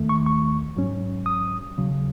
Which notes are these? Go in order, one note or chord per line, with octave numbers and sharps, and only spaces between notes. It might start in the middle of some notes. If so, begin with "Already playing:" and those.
Already playing: D#2 D#3 A3
C#6
C#6
G#2 F#3 C#4
D#6
D#2 C#3 F#3